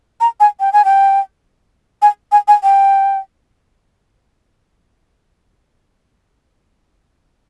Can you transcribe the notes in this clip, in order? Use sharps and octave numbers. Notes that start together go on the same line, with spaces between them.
A#5
G#5
G5
G#5
G5
G#5
G#5
G#5
G5